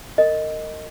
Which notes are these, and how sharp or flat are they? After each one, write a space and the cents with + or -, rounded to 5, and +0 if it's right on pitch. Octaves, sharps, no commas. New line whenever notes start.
A#4 -30 D#5 +0